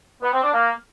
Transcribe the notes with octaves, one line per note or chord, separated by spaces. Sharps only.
B3
C4
D4
A#3